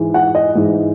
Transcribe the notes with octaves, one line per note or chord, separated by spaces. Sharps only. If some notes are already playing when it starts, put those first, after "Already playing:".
Already playing: G#2 E3 G#3
F#5
D#5
G#2 E3 G#3